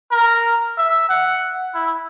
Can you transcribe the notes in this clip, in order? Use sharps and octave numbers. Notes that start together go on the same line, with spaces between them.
A#4
E5
F#5
E4